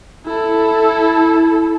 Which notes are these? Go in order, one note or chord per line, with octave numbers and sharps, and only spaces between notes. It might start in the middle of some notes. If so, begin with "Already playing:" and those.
E4 A4